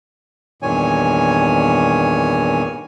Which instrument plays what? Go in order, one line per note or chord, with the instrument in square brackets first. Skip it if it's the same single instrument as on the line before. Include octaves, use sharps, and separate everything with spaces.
[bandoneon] E2 G2 A#2 D#3 C#5 G#5